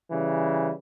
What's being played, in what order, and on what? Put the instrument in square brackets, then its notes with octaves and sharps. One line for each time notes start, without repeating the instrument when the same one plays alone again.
[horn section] C#3 E3 G3